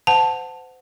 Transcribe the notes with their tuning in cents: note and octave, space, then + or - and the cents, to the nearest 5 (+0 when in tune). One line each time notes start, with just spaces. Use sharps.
C5 -30 F#5 -10 A5 +5